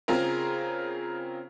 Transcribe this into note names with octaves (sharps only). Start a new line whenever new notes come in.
C#3 C4 F4 G#4 A#4